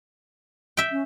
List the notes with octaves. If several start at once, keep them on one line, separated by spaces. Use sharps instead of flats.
E5 G5
C#4